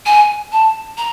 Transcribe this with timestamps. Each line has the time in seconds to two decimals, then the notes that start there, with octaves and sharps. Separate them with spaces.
0.06 G#5
0.52 A5
0.97 A#5